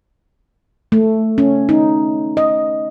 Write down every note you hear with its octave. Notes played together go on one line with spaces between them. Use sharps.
A3
C#4
D#4
D#5